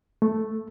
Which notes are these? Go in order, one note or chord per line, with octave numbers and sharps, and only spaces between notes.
A3